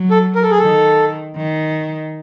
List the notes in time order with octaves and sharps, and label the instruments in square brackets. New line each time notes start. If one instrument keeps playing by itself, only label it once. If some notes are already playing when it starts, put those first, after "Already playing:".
Already playing: [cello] F#3
[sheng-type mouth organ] A4
A#4
A4
G#4
[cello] D#3 [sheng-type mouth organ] A4
[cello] D#3